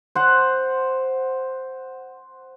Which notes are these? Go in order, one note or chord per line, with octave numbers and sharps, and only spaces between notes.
C5 F#5